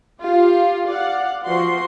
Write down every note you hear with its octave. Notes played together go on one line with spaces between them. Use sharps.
F4 G4
D5 F5 F#5
F3 F#4 C6